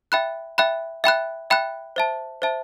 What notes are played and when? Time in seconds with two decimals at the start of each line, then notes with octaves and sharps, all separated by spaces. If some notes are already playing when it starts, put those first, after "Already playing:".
0.12 E5 G5 B5 F#6
0.58 E5 G5 B5 F#6
1.04 E5 G5 B5 F#6
1.50 E5 G5 B5 F#6
1.96 C5 E5 A5
2.42 C5 E5 A5